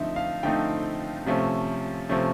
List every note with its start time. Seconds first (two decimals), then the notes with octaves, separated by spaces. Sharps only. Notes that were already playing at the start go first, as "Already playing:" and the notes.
Already playing: D3 F3 A3 C4 D#4 E5
0.16 F5
0.43 D3 F3 A3 C4 D#4 G5
1.26 C3 F3 A3 C#4
2.09 C3 F3 A3 C#4